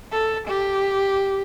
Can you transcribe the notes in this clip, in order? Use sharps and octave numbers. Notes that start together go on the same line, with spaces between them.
A4
G4